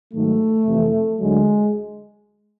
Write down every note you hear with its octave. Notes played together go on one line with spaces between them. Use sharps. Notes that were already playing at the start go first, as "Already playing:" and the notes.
G#2 D#3 F#3 A3
F2 C3 E3
D2 D3 F#3 G#3